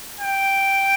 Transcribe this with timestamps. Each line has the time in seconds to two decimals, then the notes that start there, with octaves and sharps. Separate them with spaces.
0.21 G5